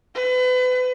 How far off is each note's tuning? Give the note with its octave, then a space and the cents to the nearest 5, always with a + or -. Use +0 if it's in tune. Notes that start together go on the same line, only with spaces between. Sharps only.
B4 +35